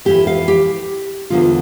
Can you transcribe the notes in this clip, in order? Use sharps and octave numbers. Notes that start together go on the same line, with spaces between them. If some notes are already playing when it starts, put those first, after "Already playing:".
F2 E3 G4
F5
G4
E2 D3 F3 F4